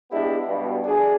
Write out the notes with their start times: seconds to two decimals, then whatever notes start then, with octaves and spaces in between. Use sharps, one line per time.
0.11 G#3 B3 D4 E4 G4
0.46 G2 B2
0.84 D2 D4 G#4